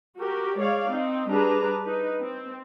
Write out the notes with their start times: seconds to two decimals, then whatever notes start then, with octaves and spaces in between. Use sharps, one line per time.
0.16 F#4 G4 A#4
0.57 G#3 C#5 D5 F5
0.87 C4 D#4
1.29 G3 D4 G#4 B4 A#5
1.84 D#4 B4
2.22 C4